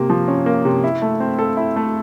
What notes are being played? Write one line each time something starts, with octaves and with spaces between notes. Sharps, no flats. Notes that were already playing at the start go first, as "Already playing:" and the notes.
Already playing: C3 A#3
F3
C#4
A#3
C3
E4
A3
C4
A4
E4
A3